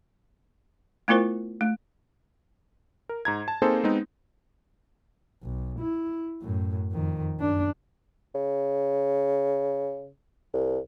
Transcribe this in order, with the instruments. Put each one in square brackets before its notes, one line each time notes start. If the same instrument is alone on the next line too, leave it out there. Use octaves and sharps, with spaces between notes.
[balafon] A3 B3 E4 F4 A#4 C5
A3
[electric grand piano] A#4
G#2 A#5 G#6
A5
A#3 C4 D#4 G#4 A4 C5
G#3 B3 C4 D#4
[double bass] B1
E4
F#2 A2
F2 D#3
F#2 D4
[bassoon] C#3
C2